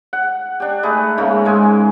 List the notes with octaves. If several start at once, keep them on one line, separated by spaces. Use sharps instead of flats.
F#5
D4 G4
A3 D#4 G#4 B4
G#2 C#3 A3 A#3
G#2 G#3 G#5